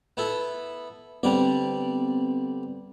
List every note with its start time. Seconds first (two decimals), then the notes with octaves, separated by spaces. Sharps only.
0.17 B3 E4 A4
1.23 D3 G3 B3 C4 D5